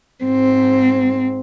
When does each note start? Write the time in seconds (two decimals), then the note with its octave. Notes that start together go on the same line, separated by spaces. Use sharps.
0.25 G#2 C4